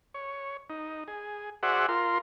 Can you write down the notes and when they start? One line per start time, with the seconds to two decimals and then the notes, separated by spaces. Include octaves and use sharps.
0.14 C#5
0.70 D#4
1.08 G#4
1.63 F#4 G#4 C5 D5 E5 F#5
1.88 F4 A#4 C6